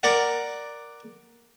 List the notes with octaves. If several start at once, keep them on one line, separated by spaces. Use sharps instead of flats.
A#4 D5 F#5